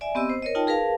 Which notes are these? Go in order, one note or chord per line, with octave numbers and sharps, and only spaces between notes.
D5 E5 G#5
B3 C4 G4 D#5 E6
C5
A#4 C#5 D#5
D#4 F4 G5 A5
G#4 A#4 B4 F5 A5